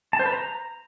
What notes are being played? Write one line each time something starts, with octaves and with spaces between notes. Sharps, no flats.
A5
C5
B4
A#5